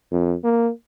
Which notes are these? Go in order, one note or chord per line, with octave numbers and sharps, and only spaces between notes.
F2
A#3